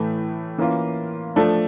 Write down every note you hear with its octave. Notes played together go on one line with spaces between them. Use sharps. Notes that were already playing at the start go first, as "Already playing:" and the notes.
Already playing: A2 E3 A3
E3 A#3 C#4 F4
F3 A3 D4